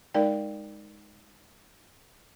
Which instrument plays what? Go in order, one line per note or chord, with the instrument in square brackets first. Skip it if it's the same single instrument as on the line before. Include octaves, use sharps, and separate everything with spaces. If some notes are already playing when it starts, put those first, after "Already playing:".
[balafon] G#3 D#4 A#4 D5 G5